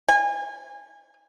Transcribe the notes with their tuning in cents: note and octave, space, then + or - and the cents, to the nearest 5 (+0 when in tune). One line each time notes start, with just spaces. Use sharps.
G#5 -30